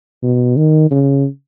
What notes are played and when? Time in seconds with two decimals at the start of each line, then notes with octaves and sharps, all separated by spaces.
0.23 B2
0.57 D#3
0.91 C#3